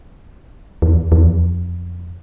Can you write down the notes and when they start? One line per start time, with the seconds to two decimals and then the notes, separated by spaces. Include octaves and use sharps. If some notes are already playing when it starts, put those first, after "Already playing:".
0.82 E2
1.12 E2
1.26 F2